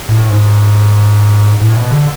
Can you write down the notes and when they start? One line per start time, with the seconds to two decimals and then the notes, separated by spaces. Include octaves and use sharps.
0.09 A2
0.29 G#2
1.61 A2
1.76 B2
1.91 D3